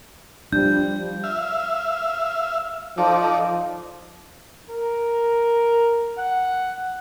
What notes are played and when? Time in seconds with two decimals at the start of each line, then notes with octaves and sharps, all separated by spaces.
0.53 F3 G3 D4 G6
1.24 E5 F5
2.98 F3 D#4 A4 D5
4.70 A#4
6.19 F#5